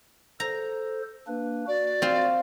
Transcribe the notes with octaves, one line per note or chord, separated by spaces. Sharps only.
A4 C5 A#5
A#3 D4 B4
F#4 D5
C4 F4